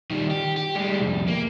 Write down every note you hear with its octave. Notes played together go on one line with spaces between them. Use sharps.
D#3 G3
G4
G4
G3 G#3
C2 F2
A#3